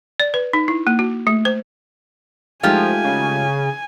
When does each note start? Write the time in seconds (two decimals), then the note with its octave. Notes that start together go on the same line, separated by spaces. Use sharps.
0.20 D5
0.34 B4
0.53 D#4
0.68 E4
0.87 A#3
0.99 F#4
1.27 A3
1.45 C5
2.63 F3 G#3 A3 D#4 F4 G4 G#5
3.04 C#3